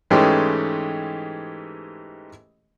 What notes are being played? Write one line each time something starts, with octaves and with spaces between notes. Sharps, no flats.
G#2 E3 G#3 A3 C#4 G4